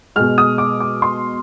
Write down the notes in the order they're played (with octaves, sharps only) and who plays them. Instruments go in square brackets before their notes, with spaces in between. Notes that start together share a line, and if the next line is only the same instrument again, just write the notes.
[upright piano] B2 G#3 F6
D#6
D6
D6
C6